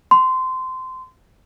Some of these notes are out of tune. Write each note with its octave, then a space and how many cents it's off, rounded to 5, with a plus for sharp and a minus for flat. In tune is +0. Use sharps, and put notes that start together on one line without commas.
C6 -20